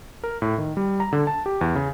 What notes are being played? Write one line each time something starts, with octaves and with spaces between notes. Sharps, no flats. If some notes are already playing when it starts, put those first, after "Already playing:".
A#4
A2
D#3
G3
A#5
D3
A5
G4
E2
C#3